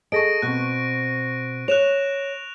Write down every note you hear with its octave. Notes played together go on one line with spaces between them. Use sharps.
G#4 A4 D#5 C#6 A#6 D7
B2 C4 F#6
C#5 F#6 E7 F7